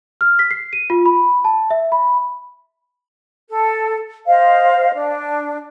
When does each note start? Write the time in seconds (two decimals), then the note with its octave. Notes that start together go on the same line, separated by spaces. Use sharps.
0.21 F6
0.39 B6
0.51 C7
0.73 D#7
0.90 F4
1.06 B5
1.45 A5
1.71 E5
1.92 B5
3.49 A4
4.27 C5 D#5 F5
4.93 D4